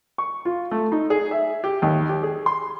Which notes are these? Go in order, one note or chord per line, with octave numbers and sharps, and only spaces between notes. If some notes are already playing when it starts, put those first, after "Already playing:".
C#6
F4
A3
D#4
G#4
E5
G4
D#2
G4
G#4
C6